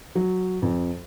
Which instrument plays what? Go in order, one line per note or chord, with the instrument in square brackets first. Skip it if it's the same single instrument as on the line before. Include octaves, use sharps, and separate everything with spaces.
[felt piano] F#3
F2